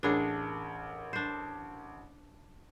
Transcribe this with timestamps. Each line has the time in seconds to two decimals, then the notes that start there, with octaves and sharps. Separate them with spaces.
0.03 A1 D4 G#4 A#4 C#5
1.13 D4 C5